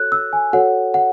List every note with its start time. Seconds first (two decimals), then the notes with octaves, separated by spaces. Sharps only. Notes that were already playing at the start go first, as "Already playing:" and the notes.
Already playing: F#4 A4 C#5 F#6
0.12 E6
0.33 G#5
0.53 F#4 A4 C#5 F#5
0.94 F#5